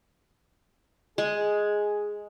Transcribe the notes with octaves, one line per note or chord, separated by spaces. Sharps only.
G#3 G#4